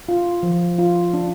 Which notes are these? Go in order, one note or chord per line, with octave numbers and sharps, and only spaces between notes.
F4
F3
F4
D4